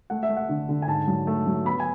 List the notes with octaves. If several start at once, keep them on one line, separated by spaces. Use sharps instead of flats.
A3 F#5
E5
A3
F#5
D3
D3
G#5
G#2 A5
F#3
A3
F#3
B3 B5
G#5